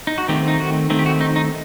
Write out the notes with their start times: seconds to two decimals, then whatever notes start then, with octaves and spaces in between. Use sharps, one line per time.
0.07 D#4
0.18 F#4
0.28 D#3 A3 C4 G4
0.48 D#4
0.60 F#4
0.90 D#3 A3 C4
0.99 G4
1.06 F#4
1.21 D#4
1.36 D#4